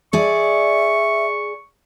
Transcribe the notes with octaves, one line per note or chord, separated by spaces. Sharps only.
G#4 D5 E5 C#6